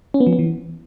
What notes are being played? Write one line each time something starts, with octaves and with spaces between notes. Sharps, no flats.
C#4
B3
F3
B3
E3